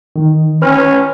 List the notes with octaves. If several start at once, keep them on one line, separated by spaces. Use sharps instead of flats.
D#3
C#4 B4 F6